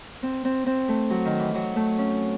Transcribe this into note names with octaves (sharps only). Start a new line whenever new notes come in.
C4
C4
C4
A3
F#3
D#3
E3
F#3
A3
C#4